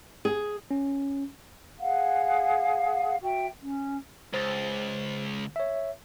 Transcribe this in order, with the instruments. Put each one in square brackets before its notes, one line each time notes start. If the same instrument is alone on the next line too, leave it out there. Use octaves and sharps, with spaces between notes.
[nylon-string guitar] G#4
[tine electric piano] C#4
[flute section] G#4 F5 F#5
F#4 E5 G5
C#4
[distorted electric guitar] C#2 [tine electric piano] C5 A6
[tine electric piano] C#5 E5